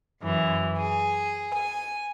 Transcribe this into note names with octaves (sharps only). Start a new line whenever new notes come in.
F#2 E3
G#4
G#5